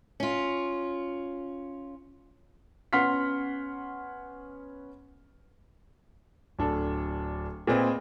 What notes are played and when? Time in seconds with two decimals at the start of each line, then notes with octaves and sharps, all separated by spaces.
0.20 C#4 F4
2.93 B3 C#4 F#5 C6 F6 B6
6.58 D1 D4 A4
7.67 A#2 C4 G#4 B4 D#5